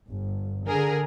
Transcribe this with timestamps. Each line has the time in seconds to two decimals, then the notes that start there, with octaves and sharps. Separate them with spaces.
0.10 G1
0.68 D3 G#4 A#4